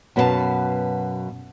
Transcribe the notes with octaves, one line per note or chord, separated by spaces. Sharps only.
F#2 B2 B3 F#4 F5 A5